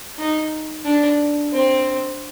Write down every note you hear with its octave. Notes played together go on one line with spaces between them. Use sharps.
D#4
D4
C4